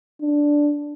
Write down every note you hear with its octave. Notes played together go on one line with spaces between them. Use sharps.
D4